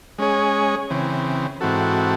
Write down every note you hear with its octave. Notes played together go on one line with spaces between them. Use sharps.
G#3 C#4 G#4 C#5
C#3 E3 C4
G#2 E3 C4 F#4 A4